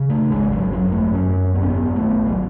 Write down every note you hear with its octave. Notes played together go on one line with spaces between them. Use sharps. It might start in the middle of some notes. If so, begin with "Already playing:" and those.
Already playing: C#3
A3
G#1 G#3
F#3
F#2 F#3
A3
F#2 C#4
G#1 B3
C#4
B3
G#1 A3
F#3